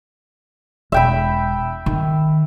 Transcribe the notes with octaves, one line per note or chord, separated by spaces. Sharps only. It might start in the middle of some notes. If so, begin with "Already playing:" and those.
E1 E5 G5 B5
D#3